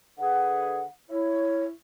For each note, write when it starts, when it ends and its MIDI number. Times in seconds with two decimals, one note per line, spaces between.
0.18 0.82 50
0.18 0.82 68
0.18 0.82 71
0.18 0.83 78
1.10 1.71 64
1.10 1.64 73